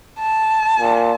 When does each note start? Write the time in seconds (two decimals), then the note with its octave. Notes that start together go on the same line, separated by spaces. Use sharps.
0.19 A5
0.80 A#2